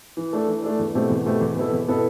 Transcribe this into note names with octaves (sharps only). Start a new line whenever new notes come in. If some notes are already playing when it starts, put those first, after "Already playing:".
E3
A3 D4 A4
E3
A3 D4 A4
E2
B2 A3 C4 G4
E2
B2 A3 C4 G4
E2
B2 B3 E4 A4
E2
B2 B3 E4 A4